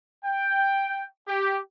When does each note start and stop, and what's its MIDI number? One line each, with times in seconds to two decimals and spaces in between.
0.24 1.04 79
1.27 1.59 67